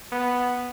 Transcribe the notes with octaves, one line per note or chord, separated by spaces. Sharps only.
B3